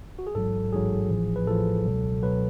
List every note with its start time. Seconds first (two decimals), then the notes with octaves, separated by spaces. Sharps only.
0.19 F#4
0.27 G#4
0.35 A1 G#2 F#3 A4
0.73 A1 G#2 F#3 G#4
1.10 A1 A2 F3
1.36 B4
1.47 A1 A2 F3 A4
1.85 C#2 B2 F#3
2.22 B2 F#3 B4